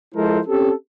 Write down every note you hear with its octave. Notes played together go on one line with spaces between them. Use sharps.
F3 G#3 E4 A4 A#4 C5
C4 C#4 G4 A4